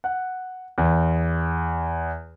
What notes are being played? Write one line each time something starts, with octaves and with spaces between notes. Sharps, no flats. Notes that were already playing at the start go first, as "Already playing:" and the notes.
F#5
E2